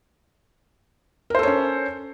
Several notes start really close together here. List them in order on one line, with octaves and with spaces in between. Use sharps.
A#4 C5 A4 C#5 C#4